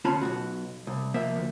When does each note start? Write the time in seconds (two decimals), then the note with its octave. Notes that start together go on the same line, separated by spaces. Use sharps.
0.05 D2 C#4 F4 A5 B5
0.21 B1 G2 F#4
0.87 C2
1.14 C3 F3 A#3 E5
1.36 D2